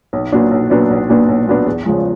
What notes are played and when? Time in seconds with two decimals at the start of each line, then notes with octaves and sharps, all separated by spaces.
0.13 B1
0.32 A#2 F#3 B3 D4
0.51 B1
0.70 A#2 F#3 B3 D4
0.90 B1
1.09 A#2 F#3 B3 D4
1.28 B1
1.47 A#2 F#3 B3 D4
1.66 E2
1.85 C#3 F3 G#3